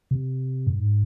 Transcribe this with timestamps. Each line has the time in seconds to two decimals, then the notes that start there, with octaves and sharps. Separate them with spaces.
0.11 C3
0.67 G2
0.79 G#2